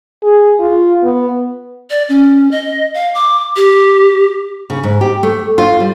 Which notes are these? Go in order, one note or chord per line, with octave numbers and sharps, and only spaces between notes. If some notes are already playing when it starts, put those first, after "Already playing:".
G#4
F4
B3
D5
C#4
D#5
F5
D6
G4
C#3
G#2
G4
A3
F4
G3